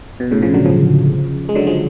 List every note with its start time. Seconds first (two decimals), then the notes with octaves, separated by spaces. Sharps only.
0.20 B2
0.31 A2 C#3
0.42 C#3 F3
0.54 D3 F#3
0.65 C#3 F3
1.49 G#3
1.55 D3 F#3
1.67 F3 G#3